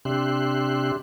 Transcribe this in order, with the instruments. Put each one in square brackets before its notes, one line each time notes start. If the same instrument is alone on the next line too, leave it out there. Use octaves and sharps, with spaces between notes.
[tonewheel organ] C3 D4 G4 E5 C6 F#6